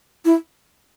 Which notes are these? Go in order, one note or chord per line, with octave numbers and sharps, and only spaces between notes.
E4